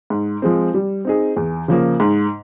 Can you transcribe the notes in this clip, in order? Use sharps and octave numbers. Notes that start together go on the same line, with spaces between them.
G#2
F3 G#3 C4
G3
C4 D#4 G#4
E2
C#3 F3 A#3
G#2